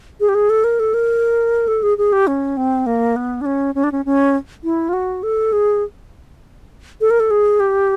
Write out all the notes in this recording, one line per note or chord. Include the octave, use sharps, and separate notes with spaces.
G#4
G4
G#4
A4
A#4
A4
A#4
A4
G#4
G#4
G4
C#4
C4
A#3
B3
D4
C#4
C#4
D4
C#4
C#4
E4
F4
F#4
A4
G#4
A4
A#4
A4
G#4
G4